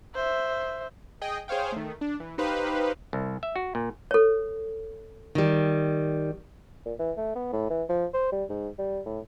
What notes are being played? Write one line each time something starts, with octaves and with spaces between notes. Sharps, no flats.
C5 E5
G#4 D#5 G5
G#4 C5 C#5 F5 G5
D#3 A3
D4
E3
D#4 G4 B4 C5 F5
C2
E5
F#4
A#2
A4 C#5
D#3 G3
A#2
E3
A3
B3
A2
E3
F3
C5
G3
G#2
G3
A2